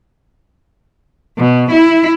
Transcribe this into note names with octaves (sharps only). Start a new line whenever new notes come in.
B2
E4